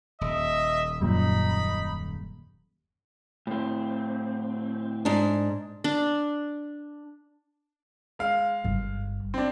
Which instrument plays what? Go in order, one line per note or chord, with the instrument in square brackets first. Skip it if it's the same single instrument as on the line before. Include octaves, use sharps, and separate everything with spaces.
[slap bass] D#1 [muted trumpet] D#5 [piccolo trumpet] E5
[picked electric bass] F#2 A#2 G3 [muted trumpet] D#4 [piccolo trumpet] B5
[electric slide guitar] A2 C4
[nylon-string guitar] G#2 D4
[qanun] D4
[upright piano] G#3 F5
[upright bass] G1
[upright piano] C4 D4